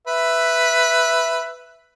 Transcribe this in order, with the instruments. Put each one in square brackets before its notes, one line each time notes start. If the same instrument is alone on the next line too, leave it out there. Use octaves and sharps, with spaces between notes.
[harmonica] B4 E5